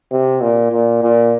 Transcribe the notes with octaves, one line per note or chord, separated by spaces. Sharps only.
C3
A#2
A#2
A#2